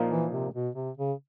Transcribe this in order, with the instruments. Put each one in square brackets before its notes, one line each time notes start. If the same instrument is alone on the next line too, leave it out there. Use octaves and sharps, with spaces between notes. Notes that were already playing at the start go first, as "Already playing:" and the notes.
Already playing: [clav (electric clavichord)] A#2 F3 A#3 D#4
[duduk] E3
C3
B2
C3
C#3